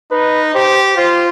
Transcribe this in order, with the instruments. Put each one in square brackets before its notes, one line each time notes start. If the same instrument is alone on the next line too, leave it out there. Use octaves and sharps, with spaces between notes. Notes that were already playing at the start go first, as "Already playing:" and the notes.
[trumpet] D#4 [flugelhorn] B4
[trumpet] G4 [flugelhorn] C5
[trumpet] F4 [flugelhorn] C5